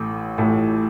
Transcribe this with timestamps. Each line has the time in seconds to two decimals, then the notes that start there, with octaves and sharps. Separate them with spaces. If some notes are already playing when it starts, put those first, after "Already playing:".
Already playing: A1 A2 A3
0.38 A1 A2 A3